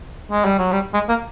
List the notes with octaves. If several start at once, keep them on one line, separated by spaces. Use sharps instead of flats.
G#3
G3
F#3
G3
G#3
A#3